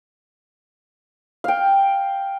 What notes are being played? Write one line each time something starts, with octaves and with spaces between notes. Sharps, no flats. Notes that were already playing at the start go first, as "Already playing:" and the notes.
F5 G5